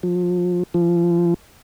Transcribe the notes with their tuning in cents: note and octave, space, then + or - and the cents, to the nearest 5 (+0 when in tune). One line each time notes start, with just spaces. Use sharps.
F3 +30
F3 -25